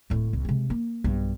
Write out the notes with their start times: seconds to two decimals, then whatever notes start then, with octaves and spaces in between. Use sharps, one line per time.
0.10 D1 A2
0.33 C2
0.45 C3 G#3
0.70 A#3
1.04 B1 G2